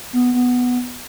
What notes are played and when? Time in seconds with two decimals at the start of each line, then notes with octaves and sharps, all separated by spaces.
0.13 B3
0.34 B3